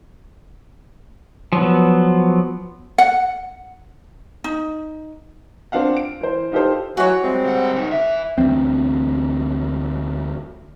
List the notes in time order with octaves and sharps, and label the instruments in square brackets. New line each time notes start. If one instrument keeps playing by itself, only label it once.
[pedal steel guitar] F3 F#3 B3
[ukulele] F#5
D#4
[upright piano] C4 D4 F4 F5 F#5
D7
E3 C5
D#4 F4 G4 A4 C5
[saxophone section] E3 F#3 [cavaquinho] F#4 C#5
[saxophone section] G3 G#3 C4
[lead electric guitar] C3 F#5
C#3 D#4
E3 E5
[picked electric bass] D2 E3 C4